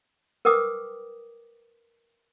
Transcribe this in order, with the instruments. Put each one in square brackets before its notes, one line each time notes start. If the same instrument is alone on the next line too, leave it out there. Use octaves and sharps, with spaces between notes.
[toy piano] A#4 B4 G5 D6 D#6